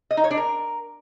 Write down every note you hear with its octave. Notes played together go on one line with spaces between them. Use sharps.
D#5
D#4
C#5
D4
A#4